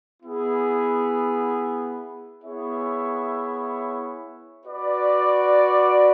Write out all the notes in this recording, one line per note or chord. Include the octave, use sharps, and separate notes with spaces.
B3 E4 G#4
B3 E4 G#4 C#5 E5
F#4 B4 D5